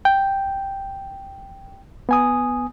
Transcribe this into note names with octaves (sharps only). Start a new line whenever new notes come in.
G5
B3 G#5 D#6